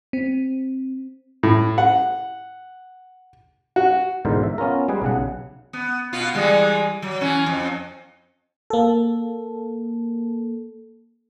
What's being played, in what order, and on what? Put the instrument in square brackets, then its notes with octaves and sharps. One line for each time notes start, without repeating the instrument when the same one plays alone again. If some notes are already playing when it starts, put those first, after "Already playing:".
[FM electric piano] C4
[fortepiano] A2
F#5
F#4
[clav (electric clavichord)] G#2 B2 D3 E3 A#4 C5
E5
B3 C#4 F4 A#4
G3 G#3 G#4 B4
B1 C#3 F#5
[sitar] B3
B2 B3 F4
E3 G3 G#3
F#3
E3 C#4
F2
[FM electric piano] A#3 A4